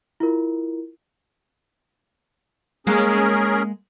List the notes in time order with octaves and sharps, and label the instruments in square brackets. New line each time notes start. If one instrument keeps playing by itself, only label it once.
[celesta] E4 F4 A#4
[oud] G#3 A#3 [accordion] C#4 G#4 A#4